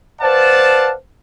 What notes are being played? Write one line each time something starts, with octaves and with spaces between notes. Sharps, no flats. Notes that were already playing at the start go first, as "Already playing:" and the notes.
B4 C5 D5 F5 F#5 A5